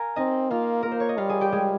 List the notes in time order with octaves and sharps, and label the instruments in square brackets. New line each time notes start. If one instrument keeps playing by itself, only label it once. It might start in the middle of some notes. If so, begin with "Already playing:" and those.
Already playing: [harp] A#4 F5 G#5 A#5
[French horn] C4 [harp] D#4 D#5
[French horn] A#3 [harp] F4 F5
[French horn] A#3 [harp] A#4
[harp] C5
C#5
D#5
[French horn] G3 [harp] F4 F5
[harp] G#4 G#5
G4 G5
G#3 G#4